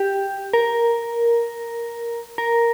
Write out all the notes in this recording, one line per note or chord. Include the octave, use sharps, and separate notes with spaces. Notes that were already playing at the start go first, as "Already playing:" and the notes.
Already playing: G4
A#4
A#4